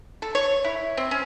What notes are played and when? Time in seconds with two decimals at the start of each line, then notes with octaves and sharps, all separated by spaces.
0.22 A4
0.35 C#5
0.64 E4
0.97 C4
1.11 C#4